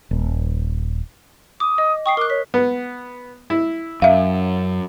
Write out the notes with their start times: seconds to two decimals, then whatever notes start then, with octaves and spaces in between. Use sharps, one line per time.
0.11 D#1
1.60 D6 D#6
1.78 D#5
2.06 G5 C#6 D#6 C7
2.17 A#4 D6 F#6
2.30 C#5 B6
2.54 B3
3.50 E4
4.02 F#2 E5 F5